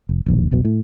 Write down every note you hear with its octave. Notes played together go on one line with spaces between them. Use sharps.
F1
E1 A#1 D#2
F1 B1 B2
A2